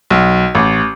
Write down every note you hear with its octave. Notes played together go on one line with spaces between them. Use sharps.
B1
A1